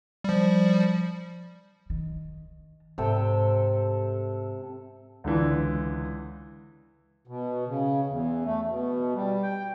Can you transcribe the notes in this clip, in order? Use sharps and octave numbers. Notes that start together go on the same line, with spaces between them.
F3 G3
D#3
G#2 C3 A4 G5
C#2 D3 E3
B2
C#3
E2
A3
B2
G3
G5